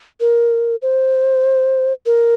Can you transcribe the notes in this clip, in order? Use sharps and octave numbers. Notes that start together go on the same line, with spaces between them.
A#4
C5
A#4